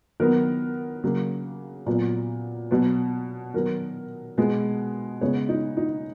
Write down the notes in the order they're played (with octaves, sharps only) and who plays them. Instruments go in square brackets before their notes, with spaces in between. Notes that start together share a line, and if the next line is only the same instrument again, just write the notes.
[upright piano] D#3 F#3 B3 A#4
C#3 F#3 A#3
A#2 F#3 B3
B2 F#3 B3
D#3 F#3 B3 A#4
B2 G#3 B3
C#3 G#3 B3 C#5
D#4
D#4